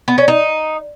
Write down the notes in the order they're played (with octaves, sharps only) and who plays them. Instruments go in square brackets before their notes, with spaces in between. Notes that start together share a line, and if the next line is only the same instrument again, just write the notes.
[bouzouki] B3
C#4
D#4